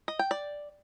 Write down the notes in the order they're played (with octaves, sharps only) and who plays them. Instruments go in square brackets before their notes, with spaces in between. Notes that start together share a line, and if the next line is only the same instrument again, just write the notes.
[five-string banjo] D#5
G5
D5